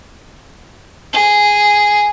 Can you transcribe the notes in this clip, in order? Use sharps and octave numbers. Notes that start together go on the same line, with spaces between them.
G#4